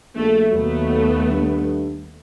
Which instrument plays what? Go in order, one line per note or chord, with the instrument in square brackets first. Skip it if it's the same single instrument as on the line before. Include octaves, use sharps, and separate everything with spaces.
[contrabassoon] A#1 [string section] A3
[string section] D#2 A3 B3 [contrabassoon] F#3
[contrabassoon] G2